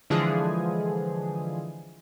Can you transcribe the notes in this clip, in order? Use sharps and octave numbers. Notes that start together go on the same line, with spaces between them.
D3 E3 F3 G#3 G#4